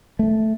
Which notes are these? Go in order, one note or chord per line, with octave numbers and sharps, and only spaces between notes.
A3